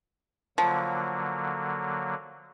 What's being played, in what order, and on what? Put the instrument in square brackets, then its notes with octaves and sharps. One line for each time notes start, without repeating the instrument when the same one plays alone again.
[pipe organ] D3 F#3 A#3 [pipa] F3